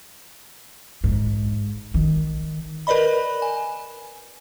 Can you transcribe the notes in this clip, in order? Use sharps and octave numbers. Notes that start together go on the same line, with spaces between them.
G#2
D#3
A#4 B4 D5 D#5 B5
G#5